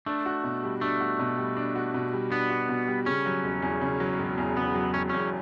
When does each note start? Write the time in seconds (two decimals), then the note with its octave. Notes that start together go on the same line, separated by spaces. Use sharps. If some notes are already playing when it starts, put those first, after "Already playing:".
0.06 A3 D4
0.26 F#4
0.44 B2
0.63 G3
0.81 A3 D4
1.01 F#4
1.19 B2
1.37 G3
1.57 D4
1.75 F#4
1.94 B2
2.13 G3
2.32 B3 D4
2.50 F#4
2.69 B2
2.88 G3
3.06 C#3 C#4
3.26 F#3
3.44 E1
3.62 E2
3.81 C#3
4.00 F#3
4.18 E1
4.38 E2
4.56 C#3 B3
4.75 F#3
4.93 E1 C#4
5.10 E2 C#4